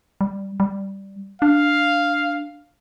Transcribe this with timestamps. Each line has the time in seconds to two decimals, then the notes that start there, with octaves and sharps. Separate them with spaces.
0.21 G3
0.60 G3
1.42 D4 F5